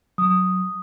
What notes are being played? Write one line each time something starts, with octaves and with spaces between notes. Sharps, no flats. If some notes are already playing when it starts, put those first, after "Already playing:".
F#3 D#6